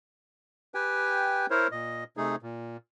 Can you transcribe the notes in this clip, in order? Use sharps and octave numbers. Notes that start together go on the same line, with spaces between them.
G4 B4 G5 G#5
E4 A#4 C5 C#5
A#2 D#5
C3 A3 D#4 G#4
A#2